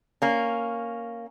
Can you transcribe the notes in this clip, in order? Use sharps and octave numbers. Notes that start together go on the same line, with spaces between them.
A#3 C#4